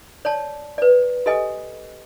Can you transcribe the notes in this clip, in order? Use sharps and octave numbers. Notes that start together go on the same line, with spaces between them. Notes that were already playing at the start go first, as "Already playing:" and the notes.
C#5 D5 A5
B4 D5
G4 A4 D#5 G#5